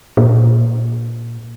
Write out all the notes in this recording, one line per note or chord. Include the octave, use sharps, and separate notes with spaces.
A#2